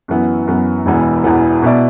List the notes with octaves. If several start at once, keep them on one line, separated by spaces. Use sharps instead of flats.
F#2 E3 B3
F#2 E3 B3
E1 E2 E3 B3
E1 E2 E3 B3
B2 B3 E4 D5